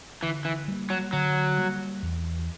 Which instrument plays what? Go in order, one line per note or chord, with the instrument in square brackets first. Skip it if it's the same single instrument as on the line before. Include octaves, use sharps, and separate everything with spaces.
[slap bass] D3 [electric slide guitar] E3
[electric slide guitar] E3
[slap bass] G3 A#3
[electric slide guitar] F#3
[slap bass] D3 [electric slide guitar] F#3
[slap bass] G3 A#3
E2